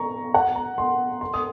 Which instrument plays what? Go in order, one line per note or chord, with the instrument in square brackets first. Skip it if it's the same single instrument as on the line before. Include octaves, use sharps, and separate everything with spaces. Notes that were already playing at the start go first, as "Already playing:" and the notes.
Already playing: [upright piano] A#5 C#6
F#5
A#5
C6
C6
D#6